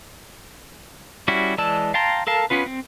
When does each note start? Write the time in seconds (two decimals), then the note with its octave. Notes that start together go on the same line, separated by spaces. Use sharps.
1.28 G3 C#4 E4 F#4
1.58 E3 G#3 D5 A5 E6
1.94 F5 G5 A5 A#5 C6
2.27 A4 A#4 F5 A5
2.50 B3 C#4 F4 B4
2.66 C4